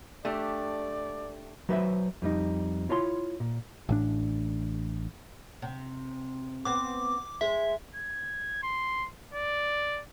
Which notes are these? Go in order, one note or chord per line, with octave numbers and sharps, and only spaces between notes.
A3 D4 G4 D5
F#3 B4 C5 E5
F2 G3 D#4
E4 F4 C#5 A#5 C6
A#2
A1 A2 D4
C3
B3 C4 D6
G#3 C5 E5
G#6
C6
D5